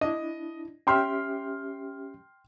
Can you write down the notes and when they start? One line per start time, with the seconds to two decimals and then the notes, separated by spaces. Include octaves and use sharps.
0.01 D4 E4 D#5
0.87 C#4 G4 E5 G5 C6 F6